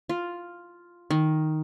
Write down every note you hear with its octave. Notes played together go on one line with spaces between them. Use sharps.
F4
D#3